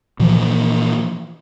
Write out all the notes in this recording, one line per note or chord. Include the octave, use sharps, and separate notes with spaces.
A#2 E3 F3 A#3